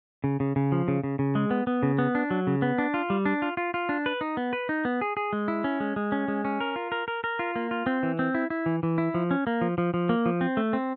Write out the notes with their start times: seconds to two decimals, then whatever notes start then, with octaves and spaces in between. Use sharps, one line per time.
0.24 C#3
0.40 C#3
0.56 C#3
0.72 F3
0.88 C#3
1.04 C#3
1.19 C#3
1.35 G#3
1.51 B3
1.67 B3
1.83 C#3
1.98 B3
2.15 D4
2.31 F#3
2.47 C#3
2.62 B3
2.78 D4
2.94 F4
3.10 G3
3.26 D4
3.42 F4
3.57 F4
3.74 F4
3.89 D4
4.06 B4
4.21 D#4
4.37 B3
4.53 B4
4.69 D#4
4.85 B3
5.01 G#4
5.17 G#4
5.33 G#3
5.48 E4
5.64 C#4
5.80 G#3
5.96 G#3
6.12 C#4
6.28 G#3
6.45 C#4
6.60 A#4
6.76 F4
6.92 A#4
7.08 A#4
7.24 A#4
7.39 F4
7.56 A#3
7.71 F4
7.86 C4
8.03 E3
8.19 C4
8.35 E4
8.50 E4
8.66 E3
8.83 E3
8.98 E4
9.14 F3
9.31 C#4
9.47 A#3
9.61 F3
9.78 F3
9.94 F3
10.09 A#3
10.26 F3
10.41 C4
10.57 A3
10.73 C4